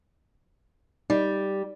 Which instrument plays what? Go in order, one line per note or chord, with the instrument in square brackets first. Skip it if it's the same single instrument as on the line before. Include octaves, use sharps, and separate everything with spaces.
[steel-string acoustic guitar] G3 [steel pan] D#4